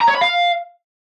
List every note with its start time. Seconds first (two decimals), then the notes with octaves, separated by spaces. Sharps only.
0.02 A#5
0.08 C#5
0.15 B5
0.22 F5